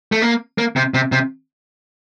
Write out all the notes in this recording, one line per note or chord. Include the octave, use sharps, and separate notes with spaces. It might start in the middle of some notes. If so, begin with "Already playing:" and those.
A3
A#3
A#3
C3
C3
C3